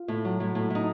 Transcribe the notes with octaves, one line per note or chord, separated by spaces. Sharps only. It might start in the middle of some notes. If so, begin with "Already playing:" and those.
Already playing: F4
A2
F#3
A2
A2
A2 D#4